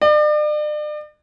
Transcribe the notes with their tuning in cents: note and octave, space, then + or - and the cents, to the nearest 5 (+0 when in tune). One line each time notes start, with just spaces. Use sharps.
D5 +40